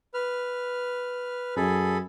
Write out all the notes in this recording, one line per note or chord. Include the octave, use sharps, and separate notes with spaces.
B4 F6
F#2 G#4 A4 B5